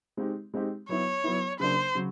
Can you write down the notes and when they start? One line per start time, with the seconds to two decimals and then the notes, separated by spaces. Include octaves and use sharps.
0.17 G#3 C4 D#4 G4
0.54 G#3 C4 D#4 G4
0.89 F#3 B3 E4 C#5
1.24 F#3 B3 E4
1.59 C#3 F#3 A#3 D4 C5
1.95 C#3 F#3